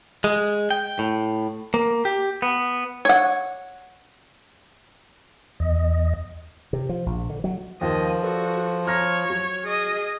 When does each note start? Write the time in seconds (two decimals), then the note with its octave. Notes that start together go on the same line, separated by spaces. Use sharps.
0.24 G#3
0.71 G5
0.99 A2
1.74 A#3
2.05 G4
2.42 B3
3.05 C#5 F#5
5.60 E2 D#5
6.73 C3
6.89 F3
7.06 A#1
7.30 D3
7.44 F#3
7.81 D#2 F3 D#5
8.22 F#4 A4 B4 D5
8.86 C#5 A#5 F6 A#6
9.30 F#3
9.65 G#4 D#5